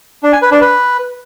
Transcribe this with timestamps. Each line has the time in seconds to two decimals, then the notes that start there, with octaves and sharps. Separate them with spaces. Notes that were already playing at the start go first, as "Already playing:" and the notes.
0.23 D4
0.33 G#5
0.42 B4
0.52 D4
0.61 B4